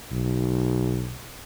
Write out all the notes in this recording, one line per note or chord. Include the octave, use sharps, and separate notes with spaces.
B1